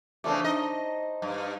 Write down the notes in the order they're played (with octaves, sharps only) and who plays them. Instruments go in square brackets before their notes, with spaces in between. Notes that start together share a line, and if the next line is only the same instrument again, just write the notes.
[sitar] C#3 E3 A3 [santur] D4 C5 D5
[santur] D#4 [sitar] D#5
[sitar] G2